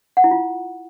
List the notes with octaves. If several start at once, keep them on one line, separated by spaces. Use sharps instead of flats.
F#5
E4
F4